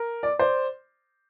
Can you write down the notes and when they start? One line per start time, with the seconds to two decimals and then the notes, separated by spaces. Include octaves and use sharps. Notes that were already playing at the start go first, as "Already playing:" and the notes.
Already playing: A#4
0.23 D5
0.39 C5 D5